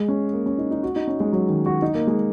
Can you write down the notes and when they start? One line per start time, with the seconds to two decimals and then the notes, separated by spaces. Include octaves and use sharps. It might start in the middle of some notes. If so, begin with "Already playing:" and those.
Already playing: G#3
0.08 C#4
0.33 A#3
0.46 C#4
0.58 D#4
0.71 D#4
0.83 F#4
0.96 D#4
1.07 C#4
1.20 G#3
1.32 F#3
1.48 D#3
1.66 F#4
1.82 D#4
1.94 A#3
2.07 G#3